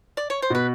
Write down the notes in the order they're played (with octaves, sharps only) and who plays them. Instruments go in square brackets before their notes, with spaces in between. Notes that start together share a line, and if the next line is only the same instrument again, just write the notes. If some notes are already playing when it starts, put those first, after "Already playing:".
[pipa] D5
C#5
C5
[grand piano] B2 [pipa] B4